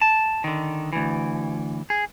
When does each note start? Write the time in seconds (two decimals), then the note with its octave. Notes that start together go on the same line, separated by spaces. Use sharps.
0.02 A5
0.44 D3 D#3
0.93 D2 E3
1.90 G#4